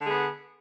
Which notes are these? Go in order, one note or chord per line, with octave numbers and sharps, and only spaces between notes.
D3 B3 G#4